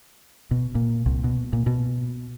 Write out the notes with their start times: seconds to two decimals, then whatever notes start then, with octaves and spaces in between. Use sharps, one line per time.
0.51 B2
0.75 A#2
1.06 C2
1.24 B2
1.53 A#2
1.66 B2